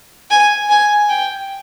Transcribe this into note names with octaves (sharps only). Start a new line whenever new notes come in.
G#5
G#5
G5